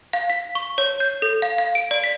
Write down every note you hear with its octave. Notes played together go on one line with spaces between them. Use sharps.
F5
B6
C#6
C#5
G6
A4
F5
F5
D7
D5
B6